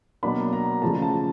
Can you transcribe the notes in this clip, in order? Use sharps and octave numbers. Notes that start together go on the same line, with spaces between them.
B2 F#3 A#3 D4 B5
A#5
C#3 F3 A3 A5
A5